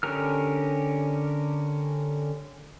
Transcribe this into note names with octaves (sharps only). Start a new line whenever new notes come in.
D3 C#4 G4 A#4 F6